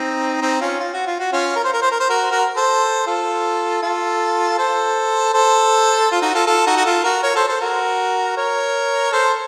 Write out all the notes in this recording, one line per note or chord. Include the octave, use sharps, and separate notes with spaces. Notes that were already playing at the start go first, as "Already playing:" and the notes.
Already playing: C4 D#4
C4 D#4
C#4 F4
F4
F#4
F4
F#4
C#4 F4
A#4
C5
A#4
C5
A#4
C5
F#4 A#4
F#4 A#4
A4 C5
F4 A4
F4 A4
A4 C5
A4 C5
F4
D#4 F#4
F4 A4
F4 A4
D#4 F#4
F#4
F4 A4
F#4 A#4
A#4 C#5
A4 C5
A4 C5
F#4 A#4
A#4 C#5
A4 C5